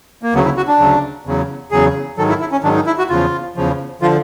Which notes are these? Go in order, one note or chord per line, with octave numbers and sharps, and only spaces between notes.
A#3
D2 C#3 F#3 B3
E4
F#4
D4
D2 C#3 F#3
E2 C#3 F#3
E2 C#3 F#3 G#4
G#2 D#3 F#3 A4
E4
E4
C#4
G#2 D#3 F#3 D4
D#4
E4
F#4
E2 C#3 F3 F4
E2 C#3 F3
D3 F3 F4